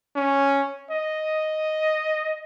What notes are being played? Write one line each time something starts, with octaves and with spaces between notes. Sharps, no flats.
C#4
D#5